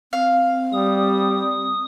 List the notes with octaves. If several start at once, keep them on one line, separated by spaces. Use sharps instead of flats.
C4 F5
G3 D#6